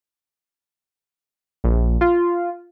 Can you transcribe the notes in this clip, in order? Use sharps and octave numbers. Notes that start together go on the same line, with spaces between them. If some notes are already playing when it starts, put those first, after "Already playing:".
A#1
F4